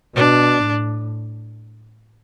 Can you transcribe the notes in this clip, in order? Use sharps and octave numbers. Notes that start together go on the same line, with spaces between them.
B2 D4
A2